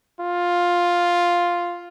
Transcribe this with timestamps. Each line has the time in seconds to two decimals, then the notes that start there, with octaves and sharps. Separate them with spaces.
0.20 F4